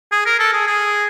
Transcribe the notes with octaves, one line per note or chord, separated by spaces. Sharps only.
G#4
A#4
A4
G#4
G#4